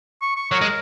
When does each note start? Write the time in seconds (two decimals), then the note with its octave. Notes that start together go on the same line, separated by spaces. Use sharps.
0.22 C#6
0.36 C#6
0.52 F#3 A#4
0.61 G#3